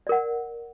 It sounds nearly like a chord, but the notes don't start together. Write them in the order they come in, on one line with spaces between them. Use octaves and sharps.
D5 A#4 F#5